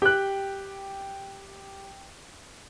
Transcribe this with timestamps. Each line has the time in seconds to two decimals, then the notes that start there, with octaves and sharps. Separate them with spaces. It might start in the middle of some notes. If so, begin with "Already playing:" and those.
0.02 G4 G5 F#6